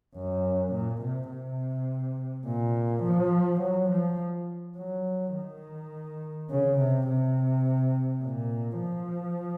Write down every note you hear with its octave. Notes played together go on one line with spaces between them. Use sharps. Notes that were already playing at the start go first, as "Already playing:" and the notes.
F#2
A#2
C3
C3
A#2
F3
F#3
F3
F#3
D#3
C#3
C3
C3
A#2
F3